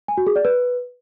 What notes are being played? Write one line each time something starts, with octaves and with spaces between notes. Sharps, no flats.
G#5
F#4
G#4
D5
B4